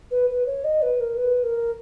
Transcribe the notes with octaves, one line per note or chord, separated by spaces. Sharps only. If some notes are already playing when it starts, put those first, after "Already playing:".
B4
B4
C#5
D#5
B4
A#4
B4
A#4